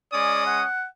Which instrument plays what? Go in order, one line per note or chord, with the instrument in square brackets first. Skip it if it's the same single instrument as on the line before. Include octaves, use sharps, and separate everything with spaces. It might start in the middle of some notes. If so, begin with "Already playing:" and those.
[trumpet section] G#3 C#4 D#6 [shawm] D5
[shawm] F#5